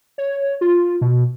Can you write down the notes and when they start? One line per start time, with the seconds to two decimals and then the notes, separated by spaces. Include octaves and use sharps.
0.18 C#5
0.61 F4
1.01 B2